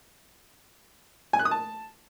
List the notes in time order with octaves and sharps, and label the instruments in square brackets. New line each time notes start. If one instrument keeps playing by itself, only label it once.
[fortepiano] G#5
F#6
D#6
A5